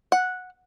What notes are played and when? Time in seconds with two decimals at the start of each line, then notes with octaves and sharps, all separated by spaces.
0.12 F#5